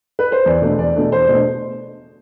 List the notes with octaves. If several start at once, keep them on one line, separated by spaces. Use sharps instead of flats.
B4
C5
E2 D5
B2 A3 D4
E2 D5
B2 A3 D4
E2 C5
B2 A3 D4